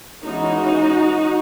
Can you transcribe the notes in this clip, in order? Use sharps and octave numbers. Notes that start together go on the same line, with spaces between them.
E3 G#3 C#4 D#4 F#4